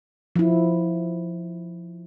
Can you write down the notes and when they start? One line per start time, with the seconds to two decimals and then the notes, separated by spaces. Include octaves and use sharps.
0.36 F3 E4